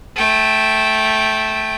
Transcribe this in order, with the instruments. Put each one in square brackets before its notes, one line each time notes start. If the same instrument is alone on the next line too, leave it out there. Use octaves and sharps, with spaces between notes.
[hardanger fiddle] A3 G5